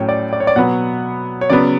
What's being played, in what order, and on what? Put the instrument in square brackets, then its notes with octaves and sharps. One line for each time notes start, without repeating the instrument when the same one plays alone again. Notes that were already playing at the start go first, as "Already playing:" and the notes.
Already playing: [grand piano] A2 F#3 C#4 C#5 G5
D5
D5
C#5
D5
B2 F#3 B3 F#5
C#5
C#3 F#3 B3 D5